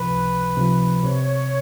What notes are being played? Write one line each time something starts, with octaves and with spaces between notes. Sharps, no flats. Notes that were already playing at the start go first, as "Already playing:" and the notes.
Already playing: C#2 C3 F3 B4
C#2
C3 F3
C3 C#5